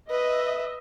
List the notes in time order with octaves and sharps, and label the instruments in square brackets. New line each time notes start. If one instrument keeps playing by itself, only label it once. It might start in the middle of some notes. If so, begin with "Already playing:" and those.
[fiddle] B4 [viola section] D#5 E5